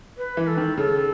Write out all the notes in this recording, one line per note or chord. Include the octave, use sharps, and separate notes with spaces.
B4
E3
A4
D#3
C#3 A4